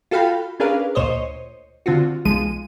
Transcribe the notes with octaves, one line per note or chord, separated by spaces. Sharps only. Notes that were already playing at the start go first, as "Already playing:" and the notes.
F4 F#4 A4 F5 G5 B5
C#4 D4 G#4 A#4 B4 F5
D2 A#2 C5 C#5 D#5
D3 C4 F4 F#4
B1 F3 G#3 D#7